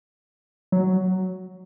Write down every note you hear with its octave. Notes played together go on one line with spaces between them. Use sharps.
F#3